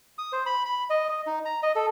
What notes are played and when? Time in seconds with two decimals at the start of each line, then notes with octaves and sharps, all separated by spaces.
0.18 D#6
0.33 C5
0.46 B5
0.66 B5
0.90 D#5
1.09 D#5
1.27 D#4
1.45 A#5
1.63 D#5
1.76 A4